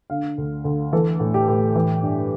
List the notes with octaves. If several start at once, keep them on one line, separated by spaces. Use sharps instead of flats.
D3 F5
D2
D2
E3 A4
A2
G4
A2
E3
G2